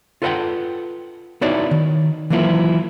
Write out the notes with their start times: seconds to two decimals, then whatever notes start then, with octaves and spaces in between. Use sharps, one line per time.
0.22 F4 A4 B4 D5 F#5 G5
1.41 B3 D#4 E4 F#4 C#5 D5
1.71 D#3
2.30 E3 F#3 A#3 E4 F4